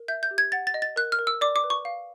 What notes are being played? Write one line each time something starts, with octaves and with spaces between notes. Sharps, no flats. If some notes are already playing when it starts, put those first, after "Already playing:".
Already playing: A#4
E5 G6
G6
G4
G#6
F#5 A6
A6
D#5
A6
A#4 F#6
F6
A#4
E6
D5 D6
D6
B4
C#6
F5